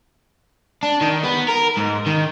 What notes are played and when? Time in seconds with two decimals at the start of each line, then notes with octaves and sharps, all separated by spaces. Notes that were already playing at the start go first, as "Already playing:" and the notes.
0.83 D4
1.01 D#3
1.24 B3
1.48 A#4
1.77 G#2
2.07 D#3